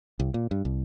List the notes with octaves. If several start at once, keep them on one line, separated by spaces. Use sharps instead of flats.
C2
A#2
G2
C2